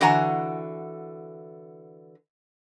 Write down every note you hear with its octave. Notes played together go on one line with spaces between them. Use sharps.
D3 E3 F#4 F#5 G#5 A#5